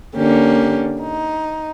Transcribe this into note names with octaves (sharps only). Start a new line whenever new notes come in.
D3 A#3 C#4 G4
D#4